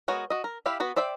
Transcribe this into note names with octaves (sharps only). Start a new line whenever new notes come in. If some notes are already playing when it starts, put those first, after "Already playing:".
G#3 B3 F#4 A#4 C#5
F#4 D#5
A#4
E4 G4 E5 F5 B5
B3 F#4 B4
C5 D5 E5 G5